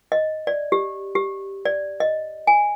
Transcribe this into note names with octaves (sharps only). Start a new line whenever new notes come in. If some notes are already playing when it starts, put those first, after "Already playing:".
D#5
D5
G4
G4
D5
D#5
G#5